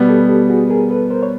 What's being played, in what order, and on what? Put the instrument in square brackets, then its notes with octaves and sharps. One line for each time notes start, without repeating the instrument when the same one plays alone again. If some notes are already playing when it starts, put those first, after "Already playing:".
Already playing: [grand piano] B2 G3 B3
[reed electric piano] G4 A4
G4 A4
F#4 G#4
G#4 A#4
A4 B4
A#4 C5
C#5